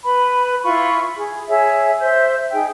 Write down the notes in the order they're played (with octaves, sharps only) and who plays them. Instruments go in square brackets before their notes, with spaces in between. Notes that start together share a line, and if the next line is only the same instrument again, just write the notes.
[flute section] B4 B5
E4 F4 B5 C#6
G#4
G#4 C#5 E5
C5 E5 G6
D#4 G#4 G5